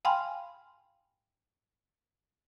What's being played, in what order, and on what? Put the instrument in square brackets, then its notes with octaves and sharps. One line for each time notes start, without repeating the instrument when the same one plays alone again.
[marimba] F5 G5 G#5 B5 C6 F6